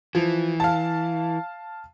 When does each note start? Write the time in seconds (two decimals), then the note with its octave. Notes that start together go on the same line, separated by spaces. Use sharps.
0.15 E3 F3
0.60 F5 A5